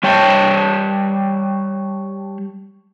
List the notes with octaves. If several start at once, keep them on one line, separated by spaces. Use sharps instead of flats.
G3 C#5 G5 A5